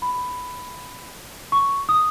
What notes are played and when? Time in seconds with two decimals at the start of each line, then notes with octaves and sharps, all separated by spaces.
0.02 B5
1.52 C#6
1.89 D#6